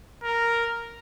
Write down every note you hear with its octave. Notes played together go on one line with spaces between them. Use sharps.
A#4